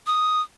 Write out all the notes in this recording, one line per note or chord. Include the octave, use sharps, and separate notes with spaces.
D#6